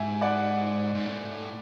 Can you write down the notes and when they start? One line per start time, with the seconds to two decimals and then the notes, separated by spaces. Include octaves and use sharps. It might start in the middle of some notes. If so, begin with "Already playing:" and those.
Already playing: G#2 E5 G#5
0.21 D5 F#5
0.94 G#2
1.06 A2